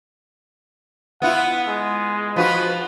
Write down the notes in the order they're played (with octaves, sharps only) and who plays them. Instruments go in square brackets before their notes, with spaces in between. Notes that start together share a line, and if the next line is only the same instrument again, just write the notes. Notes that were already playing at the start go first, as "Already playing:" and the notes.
[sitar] B3 E4 F4 [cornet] F#5
[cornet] G#3
[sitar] F3 F4 F#4 [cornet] B4